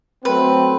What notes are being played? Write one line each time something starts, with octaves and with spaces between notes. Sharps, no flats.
F#3 A3 C4 B4